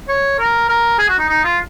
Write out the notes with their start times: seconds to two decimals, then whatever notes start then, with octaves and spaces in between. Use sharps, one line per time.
0.09 C#5
0.39 A#4
0.69 A#4
0.99 G#4
1.09 F#4
1.19 D#4
1.29 D#4
1.44 F4